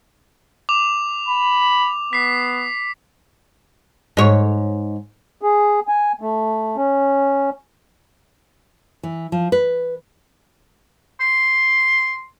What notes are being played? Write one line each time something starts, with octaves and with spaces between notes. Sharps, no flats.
D6 F7
B5
B3 B6 C7
G#2 C#5
G#4
G#5
A3
C#4
E3
F3
B4
C6